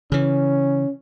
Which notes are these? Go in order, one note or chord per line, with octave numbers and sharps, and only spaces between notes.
C#3 E3 C#4